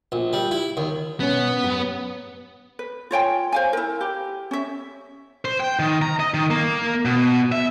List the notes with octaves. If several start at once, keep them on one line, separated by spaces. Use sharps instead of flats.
A#1
G3
E4
D#2
B2 B3 C#4
F#2 G4
B4
F4 C#5 G5 G#5
C5 F5 G#5
E4 A#4
G4
C#4 E5
C5
G5
D#3
A#5
D#5
D#3
A#3
B2
E5